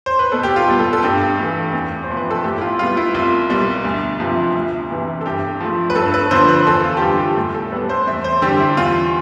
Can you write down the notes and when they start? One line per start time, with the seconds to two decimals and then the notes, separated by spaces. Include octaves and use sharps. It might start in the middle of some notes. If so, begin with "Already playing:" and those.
0.06 C5
0.19 B4
0.32 B2 A4
0.43 G4
0.56 F4
0.68 G3 B3
0.79 A4
0.93 A4
1.03 G2 G4
1.38 E3 A3
1.73 E2
2.04 C5
2.09 C3 F3 B3
2.17 B4
2.31 A4
2.44 A2 G4
2.58 E4
2.61 F4
2.79 G3 B3 F4
2.97 E4
3.14 C2 F4
3.50 B2 G3
3.85 D2
4.20 C3 F3 B3
4.55 D2
4.90 C3 E3 B3
5.21 A4
5.26 G2 G4
5.61 F3 A3
5.90 B4
5.96 G2 A4
6.14 B4
6.31 D3 F3 B3 C5
6.49 B4
6.67 E2 A4
6.84 F4
6.97 G4
7.01 D3 G3 B3 F4
7.19 G4
7.36 A2
7.55 A4
7.72 G3 B3 B4
7.89 C5
8.07 E2 E5
8.24 C5
8.42 D3 G3 G4
8.60 E4
8.77 E2 F4